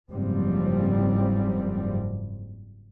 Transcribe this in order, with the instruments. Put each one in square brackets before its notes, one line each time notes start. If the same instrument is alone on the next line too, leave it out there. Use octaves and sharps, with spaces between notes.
[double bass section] F#1 G#2 F3 G3 C4